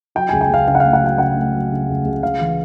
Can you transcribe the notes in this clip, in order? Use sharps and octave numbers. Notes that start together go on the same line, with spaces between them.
F#3 G5
C#2 G#5
G5
C#2 F5
C#3 F5
F#5
A3 F5
F#5
F#3 G5
C#3 F#5
A3
F#3
C#3
C#2
C#2
C#3 F5
E3